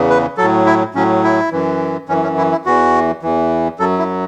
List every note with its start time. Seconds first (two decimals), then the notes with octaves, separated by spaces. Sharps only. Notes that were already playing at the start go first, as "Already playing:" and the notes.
Already playing: E2 C#3 E3
0.10 B4
0.37 A2 F#3 A4
0.66 E4
0.95 A2 F#3 C#4
1.24 E4
1.52 F#2 E3
2.08 F#2 E3 C#4
2.23 C#4
2.38 E4
2.52 E4
2.65 E2 E3 F#4
3.22 E2 E3
3.79 F#2 F#3 A4
3.99 E4